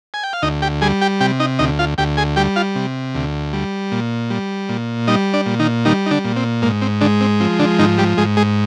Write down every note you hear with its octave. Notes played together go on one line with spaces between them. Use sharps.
G#5
G5
F5
D2 D#4 D#5
G4 G5
G3 G#4 G#5
G4 G5
C3 G4 G5
D#4 D#5
D2 D#4 D#5
F4 F5
D2 G4 G5
G#4 G#5
G3 G4 G5
F4 F5
C3
D2
G3
A#2
G3
A#2
G3 D#4 D#5
D4 D5
A#2
D#3 D#4
D#3 G3 D#4
D#4
D3 D4
A#2
C4
G#2 A#3
C4
D3 G#3 D4
C4
F3 C4
D3 D4
G#2 D#3 D#4
G3 G4
G#2 G#3 G#4
G#3 G#4